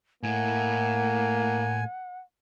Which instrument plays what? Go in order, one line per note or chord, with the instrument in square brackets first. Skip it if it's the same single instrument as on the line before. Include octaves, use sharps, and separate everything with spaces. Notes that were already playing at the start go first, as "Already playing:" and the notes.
[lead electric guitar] A2 E4 [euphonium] A#3 [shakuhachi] F#5 [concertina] G#5